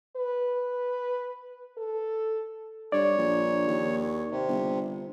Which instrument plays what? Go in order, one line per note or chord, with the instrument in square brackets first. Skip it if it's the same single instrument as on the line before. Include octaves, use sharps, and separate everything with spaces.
[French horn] B4
A4
[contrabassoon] G2 [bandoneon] C#5 [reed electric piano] D5
[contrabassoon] A#1
D#2
[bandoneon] C3
[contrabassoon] G1